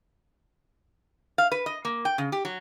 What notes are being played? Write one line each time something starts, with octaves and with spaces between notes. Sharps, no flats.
F5
B4
D#5
A#3
G5
C#3
G4
F#3